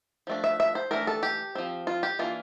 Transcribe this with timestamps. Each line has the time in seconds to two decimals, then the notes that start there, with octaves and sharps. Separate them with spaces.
0.27 F3 A3 D4
0.44 E5
0.60 E5
0.75 C5
0.91 E3 A3 D4 A#4
1.07 A4
1.23 G4
1.55 F3 C4
1.87 F4
2.03 G4
2.19 E3 A#3 D4 F4